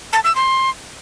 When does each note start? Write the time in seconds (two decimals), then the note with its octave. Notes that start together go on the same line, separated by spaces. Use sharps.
0.13 A5
0.24 E6
0.36 C6